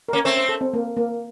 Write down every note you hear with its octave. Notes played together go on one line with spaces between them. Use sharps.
A#3 C#4 A#4
A3 C4 C#5
C5
A4
C4
A#3
A#3